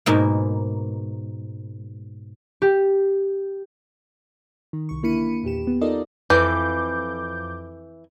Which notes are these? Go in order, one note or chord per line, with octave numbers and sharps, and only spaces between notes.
G#2 B2 A#3
G4
D#3
C2 C#6
D3 A#3 E4 B5 C#7 D#7
E2 A#2 G4 E7
B3
D#4 F4 A4 A#4 D5 D#5
F2 E3 D6 G6